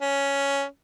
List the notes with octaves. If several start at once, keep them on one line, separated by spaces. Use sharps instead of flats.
C#4